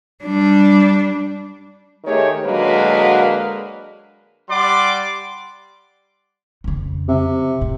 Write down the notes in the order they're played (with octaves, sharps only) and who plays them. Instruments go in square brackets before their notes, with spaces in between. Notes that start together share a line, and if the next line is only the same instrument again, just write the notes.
[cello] G3 D4
[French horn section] D#3 A3 G4 G#4 C#5
D3 F#3 G#3 A#3 B4
[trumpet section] G3 D5 F#5 C6 D6
[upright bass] F2 C#3
[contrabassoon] C3
[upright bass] A2